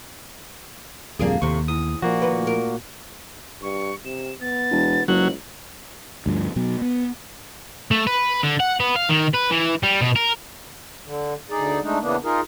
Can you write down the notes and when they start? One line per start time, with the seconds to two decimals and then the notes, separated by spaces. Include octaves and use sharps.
1.19 D1 F2 G3 A#3 D4 G#4
1.42 D#2 A2 C3 C#6
1.68 E2 D#6
2.02 A#2 F3 A#3 F#4
2.22 D2 D#3 B4
2.47 A#4
3.62 G2 C#6
4.05 C3 E7
4.41 B3 A6
4.71 E1
5.08 F#1 C#2 F#3 F#7
6.26 D2 G2 F3
6.56 B2 F#3
6.81 B3
7.91 A3
8.07 B4
8.43 D3
8.60 F#5
8.80 B3
8.96 F5
9.09 D#3
9.34 B4
9.51 E3
9.83 G3
10.01 B2
10.16 A#4
11.05 D3
11.50 D2 D#4 G#4 D5
11.83 G#3 A3 D4 D#4
12.01 C#3 E3 A#3 B3 D4
12.24 D#4 F4 G#4 A#4